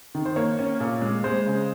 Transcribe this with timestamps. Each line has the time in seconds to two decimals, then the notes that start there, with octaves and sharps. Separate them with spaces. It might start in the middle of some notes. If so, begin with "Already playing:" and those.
0.15 D#3
0.26 C5
0.36 A#3 C#5
0.59 C#4
0.80 A#2
1.02 G#3
1.24 G#3 C5
1.46 C#3